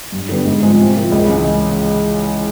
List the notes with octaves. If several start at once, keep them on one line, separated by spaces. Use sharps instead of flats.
G2
D3 G3 B3
G#2
F3 G#3 C4
C3
F3 A#3
C#2
C#3 E3 G#3